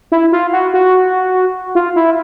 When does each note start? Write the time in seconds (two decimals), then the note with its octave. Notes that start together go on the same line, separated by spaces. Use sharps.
0.12 E4
0.32 F4
0.53 F#4
0.74 F#4
1.75 F4
1.96 E4